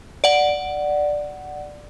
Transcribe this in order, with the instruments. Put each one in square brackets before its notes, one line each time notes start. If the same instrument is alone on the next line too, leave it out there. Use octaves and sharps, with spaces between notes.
[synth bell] D5 F#5